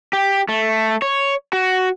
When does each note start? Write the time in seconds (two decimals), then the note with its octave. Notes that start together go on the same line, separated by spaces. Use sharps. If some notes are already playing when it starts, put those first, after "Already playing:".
0.13 G4
0.49 A3
1.02 C#5
1.53 F#4